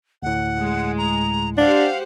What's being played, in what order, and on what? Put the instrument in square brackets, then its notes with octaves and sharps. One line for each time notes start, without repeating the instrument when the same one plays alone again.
[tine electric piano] D2 A2 [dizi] F#5
[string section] G#3
[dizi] A#5
[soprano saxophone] D4 [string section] G4 C5 F#5 [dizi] F5